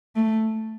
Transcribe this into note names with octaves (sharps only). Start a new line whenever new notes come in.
A3